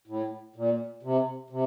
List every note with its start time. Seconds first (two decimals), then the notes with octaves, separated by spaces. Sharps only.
0.08 A2
0.56 A#2
1.03 C3
1.50 C3